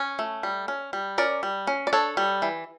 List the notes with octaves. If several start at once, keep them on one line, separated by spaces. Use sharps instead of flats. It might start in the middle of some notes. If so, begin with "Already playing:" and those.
Already playing: C#4
A3
G3
C#4
G3
C#4 A#4 D5
G3
C#4
D5
D4 A4 C#5
G3
E3